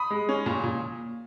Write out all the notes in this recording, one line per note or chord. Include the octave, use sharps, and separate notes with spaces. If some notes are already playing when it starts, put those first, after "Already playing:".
Already playing: B5 D#6
G#3
C#4
A#2
A#2